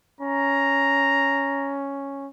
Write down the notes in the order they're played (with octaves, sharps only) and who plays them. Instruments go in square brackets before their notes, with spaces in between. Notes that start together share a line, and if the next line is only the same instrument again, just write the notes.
[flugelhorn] C#4 [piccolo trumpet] A#5